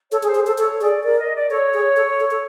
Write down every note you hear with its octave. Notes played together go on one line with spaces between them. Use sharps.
A4 C#5
G#4
C5
G#4
A4 C5
A4 C#5
G#4 D5
A#4 D5
D#5
D5
A4 C#5
G#4
A4
A4
A4